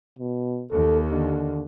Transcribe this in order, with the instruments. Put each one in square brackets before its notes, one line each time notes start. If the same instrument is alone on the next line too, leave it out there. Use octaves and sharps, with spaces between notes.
[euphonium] B2
[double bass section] D#2 [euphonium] A4
[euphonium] D3